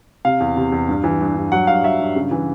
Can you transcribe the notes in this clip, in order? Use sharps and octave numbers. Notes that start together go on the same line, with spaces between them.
C3 F5
E2
C3
E2
G2
E3
G2
G2
F#3 F#5
G2 F5
F#3 E5
G2
C#3
E3